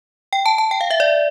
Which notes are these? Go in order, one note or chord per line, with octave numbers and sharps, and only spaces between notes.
G5
A5
A5
G5
F5
E5
D5